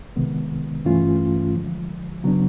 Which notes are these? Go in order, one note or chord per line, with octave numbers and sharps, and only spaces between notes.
C2 C3 D#3 G#3 B3
G2 E3 A3 C#4 F4
D3 F3 G#3
C#3 F#3 B3 D4